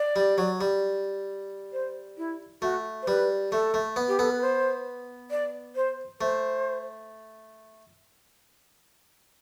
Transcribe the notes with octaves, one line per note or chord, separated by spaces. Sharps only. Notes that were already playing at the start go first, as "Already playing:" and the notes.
Already playing: D5
G3
F#3
G3
C5
E4
A3 F#4
C5
G3 B4
A3 A4
A3
B3
G4
B3 A4
B4
C5
D5
C5
A3 C5